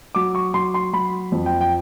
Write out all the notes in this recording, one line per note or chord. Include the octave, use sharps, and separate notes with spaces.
F#3 D6
C#6
F#3 C6
C6
F#3 B5
F2
G5
G5